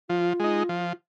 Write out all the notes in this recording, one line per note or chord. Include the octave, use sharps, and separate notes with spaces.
F3 F4
G#3 D#4
F3